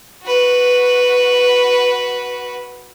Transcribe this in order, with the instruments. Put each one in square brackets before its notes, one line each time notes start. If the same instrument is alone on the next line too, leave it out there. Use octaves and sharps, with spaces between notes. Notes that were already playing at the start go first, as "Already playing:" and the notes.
[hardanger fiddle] F#4 B4